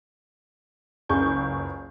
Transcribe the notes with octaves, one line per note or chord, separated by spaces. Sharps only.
F#1 C#2 G#4 C#6 G6